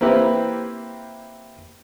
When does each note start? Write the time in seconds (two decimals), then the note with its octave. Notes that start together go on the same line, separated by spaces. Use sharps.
0.01 A#3 C4 E4 G4 B4